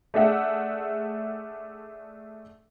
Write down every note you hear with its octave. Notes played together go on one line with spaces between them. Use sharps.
A3 D4 G#4 E5 F#5